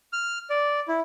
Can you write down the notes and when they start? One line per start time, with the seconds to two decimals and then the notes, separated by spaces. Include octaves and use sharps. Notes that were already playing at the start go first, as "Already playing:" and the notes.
0.13 F6
0.50 D5
0.88 E4